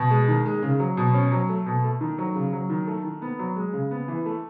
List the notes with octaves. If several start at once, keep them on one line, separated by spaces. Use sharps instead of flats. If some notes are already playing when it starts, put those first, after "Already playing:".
Already playing: B2
G#3
D#3
G#3
C#3
F#3
B2
C#4
F#3
A3
B2
A3
D#3
F#3
C#3
F#3
D#3
A3
D#3
B3
F#3
G#3
C#3
B3
E3
A3